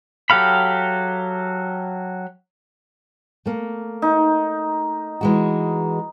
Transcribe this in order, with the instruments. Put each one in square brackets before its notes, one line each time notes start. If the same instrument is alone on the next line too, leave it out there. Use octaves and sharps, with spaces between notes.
[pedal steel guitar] F#3 G4 A4 F5 B5
[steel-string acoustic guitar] A3 A#3
[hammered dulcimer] D#4
[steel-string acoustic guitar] E3 G#3 F#4